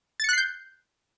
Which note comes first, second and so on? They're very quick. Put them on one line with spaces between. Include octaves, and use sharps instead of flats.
A6 C#7 F#6 C7 G6